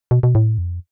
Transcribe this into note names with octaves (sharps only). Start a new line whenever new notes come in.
B2
B2
A2
F2